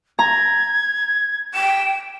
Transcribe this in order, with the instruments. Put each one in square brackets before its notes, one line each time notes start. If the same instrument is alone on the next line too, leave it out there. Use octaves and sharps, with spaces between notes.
[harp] A#5 [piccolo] G#6
[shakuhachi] G5 [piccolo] E7